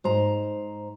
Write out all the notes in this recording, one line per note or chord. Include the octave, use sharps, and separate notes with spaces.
G#2 C5 A#5